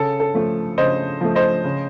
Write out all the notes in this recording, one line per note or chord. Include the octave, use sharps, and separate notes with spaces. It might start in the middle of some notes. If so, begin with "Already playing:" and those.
Already playing: C#3 A4
A4
F3 A3
C#3 C5 D#5
F3 A3
C5 D#5
C#3